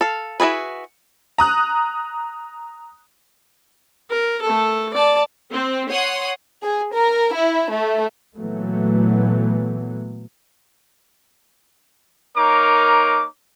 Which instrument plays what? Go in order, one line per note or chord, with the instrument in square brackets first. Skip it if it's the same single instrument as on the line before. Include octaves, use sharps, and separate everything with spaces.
[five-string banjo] A4 F5
E4 F#4 G#4 B4
[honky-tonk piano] A#5 D#6 F#6
[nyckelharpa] A#4
A3 A4
D5 A5
[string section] C4
C#5 F#5 C6 D#6
G#4
A#4
E4
A3
[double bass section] A#2 E3 F#3 A3 B3
[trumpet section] A#3 D#4 A#4 C#5 D6